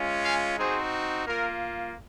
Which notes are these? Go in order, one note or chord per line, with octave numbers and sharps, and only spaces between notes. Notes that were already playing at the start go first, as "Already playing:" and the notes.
Already playing: G#3 C#4 F4
F5 G#5
C4 D#4 F#4 G#4 C5
A#3 F4 A#4